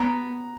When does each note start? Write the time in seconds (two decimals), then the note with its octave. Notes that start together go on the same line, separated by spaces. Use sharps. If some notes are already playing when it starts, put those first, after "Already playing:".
Already playing: B3 A#5